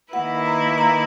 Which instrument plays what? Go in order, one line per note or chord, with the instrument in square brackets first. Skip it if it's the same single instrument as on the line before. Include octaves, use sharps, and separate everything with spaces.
[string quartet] D#3 A#3 E4 B4 [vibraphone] F#5
[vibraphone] A#5
A#5